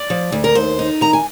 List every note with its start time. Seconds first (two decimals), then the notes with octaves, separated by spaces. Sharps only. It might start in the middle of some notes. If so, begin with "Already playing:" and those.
Already playing: D5
0.10 F3
0.32 D2
0.44 A#4
0.55 D#2 C5
0.79 D#4
1.01 D#3 A#5
1.13 G#5